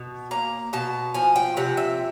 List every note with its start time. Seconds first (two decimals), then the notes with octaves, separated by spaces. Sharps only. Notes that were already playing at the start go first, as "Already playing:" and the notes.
Already playing: B2
0.31 A#3 A#5
0.73 B2 A5
1.14 F3 G#5
1.36 G5
1.57 C3 F#5
1.77 E5